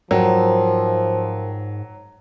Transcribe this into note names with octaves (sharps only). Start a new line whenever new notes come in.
G#2 F3 F#3 A#4 G5